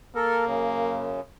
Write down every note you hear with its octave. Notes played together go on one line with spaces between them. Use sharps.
A#3 A4 A#4
F#2 C#3